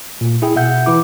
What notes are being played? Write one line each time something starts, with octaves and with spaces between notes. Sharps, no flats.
A#2
E4 G#4 G5
B2 E5 F#5 G6
E3 E4 D6